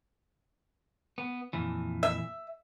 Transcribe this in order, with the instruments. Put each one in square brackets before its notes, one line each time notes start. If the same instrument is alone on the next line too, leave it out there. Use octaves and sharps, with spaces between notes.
[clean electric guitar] B3
F2 A#2 E3
[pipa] E5